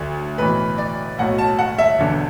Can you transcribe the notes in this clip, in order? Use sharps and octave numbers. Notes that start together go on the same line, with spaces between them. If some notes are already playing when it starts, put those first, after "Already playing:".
Already playing: D2 D3 F#3
B1 A2 E3 B4
D5
B1 A2 F#3 F#5
A5
F#5
E5
E1 E2 D3